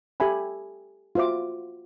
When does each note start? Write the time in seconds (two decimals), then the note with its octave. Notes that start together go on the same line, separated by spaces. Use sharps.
0.20 G4 A4 E5 G#5 B5
1.15 F4 F#4 C5 E5 D6